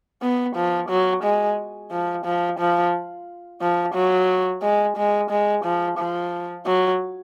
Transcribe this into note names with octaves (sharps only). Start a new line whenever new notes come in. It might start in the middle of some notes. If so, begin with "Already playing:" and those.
B3
F3
F#3
G#3
F3
F3
F3
F3
F#3
G#3
G#3
G#3
F3
F3
F#3